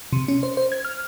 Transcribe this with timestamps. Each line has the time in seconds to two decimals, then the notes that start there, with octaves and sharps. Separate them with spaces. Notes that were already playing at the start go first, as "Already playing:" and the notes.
0.13 C3
0.28 C#4
0.43 C5
0.57 C5
0.72 G#6
0.85 F6